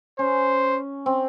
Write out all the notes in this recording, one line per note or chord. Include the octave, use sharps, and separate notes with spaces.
C#4 C5
C4